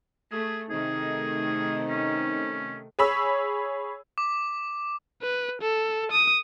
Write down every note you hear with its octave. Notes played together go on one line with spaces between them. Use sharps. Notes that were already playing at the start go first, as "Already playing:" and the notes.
A3 G#4
C3 D#3 A3 C4 D#4 G#4
C#4
G#4 C#5 B5 E6
D6
B4
A4
D#6